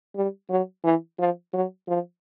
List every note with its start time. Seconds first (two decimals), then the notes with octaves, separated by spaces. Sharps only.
0.16 G3
0.50 F#3
0.84 E3
1.19 F3
1.53 F#3
1.88 F3